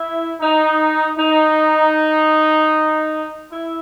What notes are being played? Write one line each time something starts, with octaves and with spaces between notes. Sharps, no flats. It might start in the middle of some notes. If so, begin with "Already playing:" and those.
Already playing: E4
D#4
D#4
E4